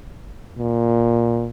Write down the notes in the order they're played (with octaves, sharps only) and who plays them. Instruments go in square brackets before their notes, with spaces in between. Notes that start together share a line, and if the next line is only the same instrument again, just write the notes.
[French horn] A#2